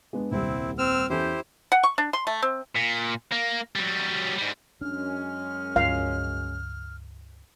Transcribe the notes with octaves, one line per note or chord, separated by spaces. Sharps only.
G#3 B3 D4
D#1 C2 C4 E4
C4 E6 F6
E2 C#4 E4 G4 A4 C5
F#5
C#6
D4
C6
A3
C4
A#2
A#3
F#3 G3
G#2 G3
F#2 G#3 C#4 D4 F6
C#2 G2 F3 F5